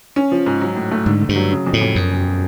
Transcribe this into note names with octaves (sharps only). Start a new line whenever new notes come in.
C#4
F3
G#2
F#3
A2
A3
G#2 D3
D3
G2
F#3
C#3
F2
A2
F2
E1 F#2
E1